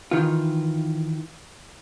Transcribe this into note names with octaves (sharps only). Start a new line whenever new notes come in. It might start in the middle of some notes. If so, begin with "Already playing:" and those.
D#3 E3 F4